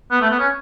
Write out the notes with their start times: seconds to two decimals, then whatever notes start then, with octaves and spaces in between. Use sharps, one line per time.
0.11 B3
0.21 A3
0.30 B3
0.39 C#4